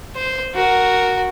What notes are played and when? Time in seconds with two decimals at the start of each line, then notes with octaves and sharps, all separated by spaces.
0.16 C5
0.54 F#4 A#4